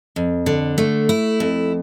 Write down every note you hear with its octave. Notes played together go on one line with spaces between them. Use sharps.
F2
D3
A3
E4
F2